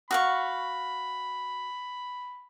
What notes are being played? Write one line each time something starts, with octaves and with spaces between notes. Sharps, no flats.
F#4 F5 B5 C#6